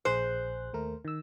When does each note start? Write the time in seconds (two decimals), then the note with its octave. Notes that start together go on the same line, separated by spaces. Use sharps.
0.05 A#1 G#4 C5 F#6
0.73 D#2 A3 A#4
1.05 D#3 E6